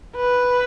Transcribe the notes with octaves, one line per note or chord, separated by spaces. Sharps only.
B4